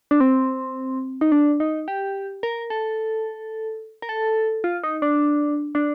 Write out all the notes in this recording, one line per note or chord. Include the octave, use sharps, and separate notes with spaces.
D4
C4
D#4
D4
D#4
G4
A#4
A4
A#4
A4
F4
D#4
D4
D4